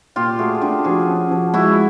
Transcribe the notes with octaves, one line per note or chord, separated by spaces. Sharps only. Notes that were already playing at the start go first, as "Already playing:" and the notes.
A#2 F4 G4
A3 F#4 G#4
D4 F4 G4
F3 F#4 G#4
C#4
F3
G#3 E4 F#4